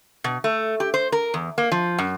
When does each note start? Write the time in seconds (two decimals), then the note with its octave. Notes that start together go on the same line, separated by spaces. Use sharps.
0.24 B2
0.44 A3
0.80 G4
0.94 C5
1.12 A#4
1.34 E2
1.58 A#3
1.72 F3
1.98 F#2